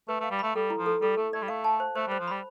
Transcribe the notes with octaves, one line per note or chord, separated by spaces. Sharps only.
A3 B4
A3
F5
G3
A3 B5
G3 A4
E4
F3
A4
G3 A4
A3 A4
A3 D5
G3
A3 F5
A5
C5
A3 C5
G3
C5
F3
G3 B5